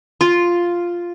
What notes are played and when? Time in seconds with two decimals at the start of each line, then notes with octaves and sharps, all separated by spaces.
0.21 F4